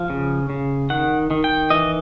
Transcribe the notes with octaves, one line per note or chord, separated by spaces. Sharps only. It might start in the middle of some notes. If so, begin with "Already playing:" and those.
Already playing: F3 F5
C#3
C#3
D#3 F#5
D#3
G5
E3 D#5